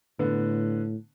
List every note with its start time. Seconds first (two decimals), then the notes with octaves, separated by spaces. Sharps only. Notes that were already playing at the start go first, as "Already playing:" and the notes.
0.19 A2 D3 B3